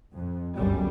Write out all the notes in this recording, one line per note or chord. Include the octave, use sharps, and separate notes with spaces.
F2
G1 C#2 F#2 G3